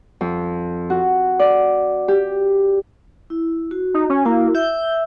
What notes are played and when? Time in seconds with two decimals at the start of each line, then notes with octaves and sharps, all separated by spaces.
0.21 F2
0.90 F#4
1.39 D5
2.08 G4
3.30 E4
3.71 F#4
3.94 D#4
4.10 C#4
4.25 A#3 E4 F#4
4.55 E5 E6 G6